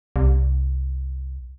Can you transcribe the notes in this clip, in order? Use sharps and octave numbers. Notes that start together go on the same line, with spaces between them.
C2